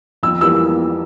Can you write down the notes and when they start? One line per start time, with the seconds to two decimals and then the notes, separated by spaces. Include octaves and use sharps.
0.23 F2 E6
0.41 E3 G3 A#3 E6